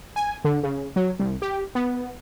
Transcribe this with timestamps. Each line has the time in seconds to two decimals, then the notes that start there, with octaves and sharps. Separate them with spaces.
0.16 G#5
0.44 D3
0.63 C#3
0.96 F#3
1.19 C2
1.42 G4
1.75 B3